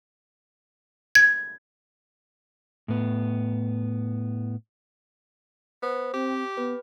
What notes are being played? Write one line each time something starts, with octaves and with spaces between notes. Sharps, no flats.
G#6
A2 B3
B3 C5
C4 G4
B3 B4